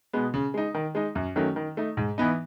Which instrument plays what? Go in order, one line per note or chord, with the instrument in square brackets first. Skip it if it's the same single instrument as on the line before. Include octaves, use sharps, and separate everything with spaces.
[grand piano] B2 G#3 B3
C#3
G#3 D#4
D#3
G#3 D#4
F#2
D#3 F#3 A3 C#4
D#3
A3 D#4
G#2
E3 B3 D#4